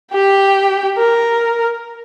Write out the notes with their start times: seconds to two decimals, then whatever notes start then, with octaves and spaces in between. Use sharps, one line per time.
0.12 G4 G5
0.98 A#4